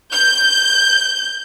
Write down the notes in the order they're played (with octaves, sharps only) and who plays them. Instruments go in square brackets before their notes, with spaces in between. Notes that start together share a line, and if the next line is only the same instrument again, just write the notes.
[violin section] G6